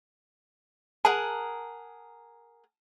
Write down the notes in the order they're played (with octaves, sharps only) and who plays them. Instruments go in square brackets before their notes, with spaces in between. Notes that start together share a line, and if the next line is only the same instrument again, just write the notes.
[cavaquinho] G#4 A#4 F#5 [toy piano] A5